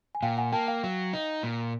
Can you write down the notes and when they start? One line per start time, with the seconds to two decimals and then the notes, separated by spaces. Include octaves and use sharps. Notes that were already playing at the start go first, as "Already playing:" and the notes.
0.15 G#5
0.22 A#2 F5 G5
0.37 F#5 G#5
0.52 A#3 G5 A5
0.68 F5 G5
0.84 F#3
1.13 D#4
1.43 A#2